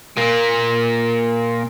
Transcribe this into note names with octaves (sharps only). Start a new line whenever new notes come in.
A#2 A#3